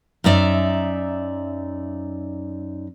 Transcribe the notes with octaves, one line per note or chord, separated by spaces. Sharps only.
F#2 D#4 D5 E5